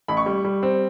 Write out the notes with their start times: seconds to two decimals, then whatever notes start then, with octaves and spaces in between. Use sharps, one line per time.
0.08 A1 B5
0.17 C#6
0.26 G3
0.44 G3
0.63 C4